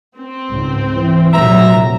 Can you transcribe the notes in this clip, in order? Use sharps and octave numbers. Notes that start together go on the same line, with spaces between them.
C4
C#2 G#2
E3
F1 A#2 F#3 E5 A#5